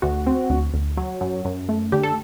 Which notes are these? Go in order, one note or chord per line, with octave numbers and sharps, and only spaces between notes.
D2 F#4
C4
D2
D2
F#3
F#2
F#2
A3
D3 G4
A4